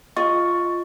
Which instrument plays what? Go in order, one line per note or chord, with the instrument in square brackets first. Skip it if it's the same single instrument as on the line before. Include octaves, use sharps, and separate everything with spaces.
[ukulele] F4 D#5 [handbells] C#6